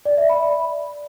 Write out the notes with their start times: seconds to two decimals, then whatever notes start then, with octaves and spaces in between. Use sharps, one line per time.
0.05 D5
0.17 E5
0.29 B5